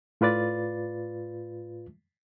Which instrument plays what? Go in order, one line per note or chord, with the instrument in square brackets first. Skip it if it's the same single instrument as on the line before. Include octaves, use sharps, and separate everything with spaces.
[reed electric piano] A2 F4 B4 D5 A6